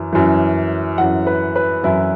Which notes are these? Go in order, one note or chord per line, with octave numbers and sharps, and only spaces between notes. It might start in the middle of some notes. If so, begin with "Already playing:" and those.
Already playing: F#2 E3
F#2 E3
F#2 E3 F#5
B4
B4
F#2 E3 E4